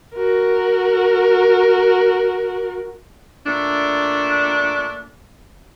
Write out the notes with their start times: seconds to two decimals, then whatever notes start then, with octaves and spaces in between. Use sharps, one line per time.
0.15 F#4 A#4
3.46 A#2 A3 D4